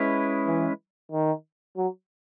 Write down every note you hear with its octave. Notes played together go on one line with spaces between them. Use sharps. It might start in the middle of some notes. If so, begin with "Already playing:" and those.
Already playing: G#3 C#4 E4 B4
E3
D#3
F#3